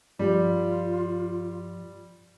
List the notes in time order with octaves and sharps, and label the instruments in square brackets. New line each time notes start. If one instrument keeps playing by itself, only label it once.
[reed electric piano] G2 F3 [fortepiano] G3 [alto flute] F4